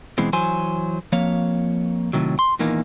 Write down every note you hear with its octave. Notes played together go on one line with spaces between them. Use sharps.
B2 E3 G#3 C4
E3 F#3 C5 G#5
F2 F3 A#3 C#5 F5
A2 C3 D#3 F#3
C6
E2 A#2 D#3 E3 A#3 D#4